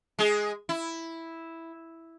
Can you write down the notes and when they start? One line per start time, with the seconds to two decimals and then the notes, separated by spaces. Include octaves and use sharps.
0.19 G#3 G#4
0.69 E4